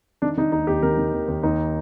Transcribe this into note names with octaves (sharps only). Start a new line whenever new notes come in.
D#3 D4
D#3 D#4
D#2 D#4
D#2 G4
D#3 A#4
D#3
D#2
D#2
D#2 D#4